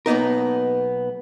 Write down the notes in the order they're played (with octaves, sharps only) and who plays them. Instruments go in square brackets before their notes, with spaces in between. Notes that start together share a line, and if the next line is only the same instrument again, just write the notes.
[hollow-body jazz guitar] B1 A#3 B3 D#4 A#4